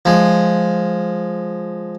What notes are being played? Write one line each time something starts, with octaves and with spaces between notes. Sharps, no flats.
F3 G#3